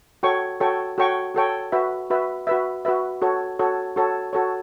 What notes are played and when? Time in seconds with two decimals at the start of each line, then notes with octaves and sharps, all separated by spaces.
0.23 F#4 A4 C#5 G5 C#6
0.61 F#4 A4 C#5 G5 C#6
0.98 F#4 A4 C#5 G5 C#6
1.35 F#4 A4 C#5 G5 C#6
1.72 F#4 B4 E5
2.10 F#4 B4 E5
2.47 F#4 B4 E5
2.85 F#4 B4 E5
3.22 F#4 A4 C#5
3.59 F#4 A4 C#5
3.96 F#4 A4 C#5
4.33 F#4 A4 C#5